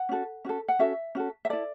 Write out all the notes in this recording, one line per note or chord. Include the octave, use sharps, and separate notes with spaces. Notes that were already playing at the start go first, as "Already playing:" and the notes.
Already playing: F#5
C#4 F#4 A4
C#4 F#4 A4
F#5
C#4 F#4 A4 E5
C#4 F#4 A4
E5
E4 A4 D5